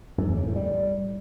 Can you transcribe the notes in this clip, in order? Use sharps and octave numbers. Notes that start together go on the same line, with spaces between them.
F#2
E2
C#3
A2
G3